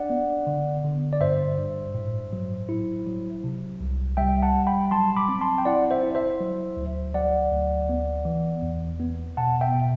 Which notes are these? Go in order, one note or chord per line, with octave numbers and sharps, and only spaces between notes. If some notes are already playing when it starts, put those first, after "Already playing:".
Already playing: D4 D5 F#5
B3
D3
D3
D5
G2 C5 E5
G2
A2
F#3
E4
F#3
C3
C2
G3 E5 G5
F#5 A5
G3
G5 B5
F#3 A5 C6
B5 D6
C4
A5 C6
G5
E4 D5 F#5
C5 E5
E4
C5 E5
F#3
D2
F#3 D5 F#5
D2
B3
E3
E2
B3
B2 F#5 A5
E5 G5
B2